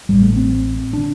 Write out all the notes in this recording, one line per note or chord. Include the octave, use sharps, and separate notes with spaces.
A1 A2 G3
A3
C4
D3 D4